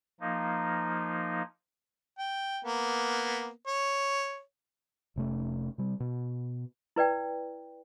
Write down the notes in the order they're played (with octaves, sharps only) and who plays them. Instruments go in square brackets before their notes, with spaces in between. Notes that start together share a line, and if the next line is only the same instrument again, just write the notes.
[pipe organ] F3 A#3 D#4
[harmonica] G5
A#3 B3
C#5
[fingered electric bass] F1 C3 A3 C#4
C3 G3
B2
[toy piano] E4 B4 D5 G5